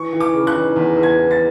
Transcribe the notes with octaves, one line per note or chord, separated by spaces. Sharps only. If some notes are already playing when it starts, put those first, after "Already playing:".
Already playing: E3 C#6
E3
D6
C#3
F#6
E3
E2
E2
G#6
E3
A6